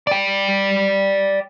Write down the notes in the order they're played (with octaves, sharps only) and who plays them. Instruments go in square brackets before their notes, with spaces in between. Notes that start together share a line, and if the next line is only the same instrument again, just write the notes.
[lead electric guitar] D5 G5